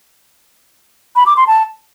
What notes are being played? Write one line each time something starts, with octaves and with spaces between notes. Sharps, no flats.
B5
D6
C6
A5